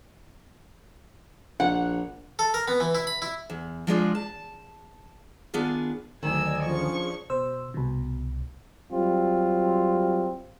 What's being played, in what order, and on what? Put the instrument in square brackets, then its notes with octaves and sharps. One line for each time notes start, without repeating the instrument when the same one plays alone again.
[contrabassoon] A#1 [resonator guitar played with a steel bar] F#5
[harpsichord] A4
A#4
B3
E3
E4
B5
E4
[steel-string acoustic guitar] E2
F3 G#3 D4 F4
A5
D#3 B3 D4 F4 G#4
[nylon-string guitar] D2 D#3 [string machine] F#3 D5 D#5 [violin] G#5 E6
[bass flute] F3 [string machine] C#4 D4 G#4 [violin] C#6
[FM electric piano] B2 C5 E6
C2 B2
[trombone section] F#3 G3 C4 F4